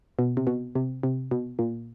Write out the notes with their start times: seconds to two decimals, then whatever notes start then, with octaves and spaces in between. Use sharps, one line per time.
0.19 B2
0.37 C3
0.47 B2
0.75 C3
1.03 C3
1.31 B2
1.59 A#2